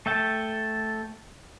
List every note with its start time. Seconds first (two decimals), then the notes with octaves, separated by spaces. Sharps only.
0.06 A3 E5 G5 A5